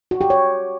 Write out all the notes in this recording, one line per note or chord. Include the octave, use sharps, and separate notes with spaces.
F#4
G4
C#5